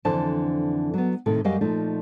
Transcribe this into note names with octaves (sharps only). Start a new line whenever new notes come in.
F2 D3 E3 C5 A5
F#3 B3
A2 C3 D#3 A4
F#2 G3 G4 D#5 F5
A#2 F3 A3 D#4